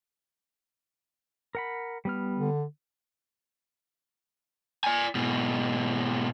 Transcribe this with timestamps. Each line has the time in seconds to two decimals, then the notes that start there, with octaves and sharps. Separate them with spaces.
1.55 A#4 F#5 B5
2.05 G3 B3 F6
2.35 D3
4.84 D5 G#5
5.15 G#2 B2